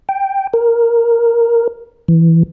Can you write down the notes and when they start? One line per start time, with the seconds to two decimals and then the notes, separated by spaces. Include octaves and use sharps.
0.09 G5
0.54 A#4
2.08 E3